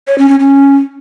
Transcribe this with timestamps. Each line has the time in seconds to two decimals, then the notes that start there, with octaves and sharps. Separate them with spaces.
0.07 C#5
0.18 C#4
0.29 C#4
0.40 C#4